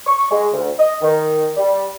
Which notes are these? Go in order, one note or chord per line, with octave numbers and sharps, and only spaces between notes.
C#6
G#3
D2
D#5
D#3
G3